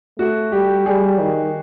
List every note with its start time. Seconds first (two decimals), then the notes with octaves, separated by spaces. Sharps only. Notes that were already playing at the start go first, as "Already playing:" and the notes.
0.19 A3 F#4
0.52 G3 G4
0.86 G3 G#4
1.20 D#3